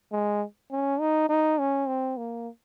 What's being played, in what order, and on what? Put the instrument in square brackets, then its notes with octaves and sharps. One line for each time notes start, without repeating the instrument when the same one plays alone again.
[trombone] G#3
C#4
D#4
D#4
C#4
C4
A#3